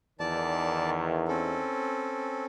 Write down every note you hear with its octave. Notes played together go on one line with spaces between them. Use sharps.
E2 D#3 D5 A5
C4 C#4 A4